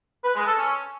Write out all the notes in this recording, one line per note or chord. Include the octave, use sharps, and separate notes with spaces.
B4
G#3
A4
C#4